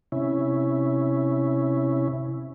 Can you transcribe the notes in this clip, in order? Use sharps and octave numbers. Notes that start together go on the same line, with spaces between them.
C3 C#4 E4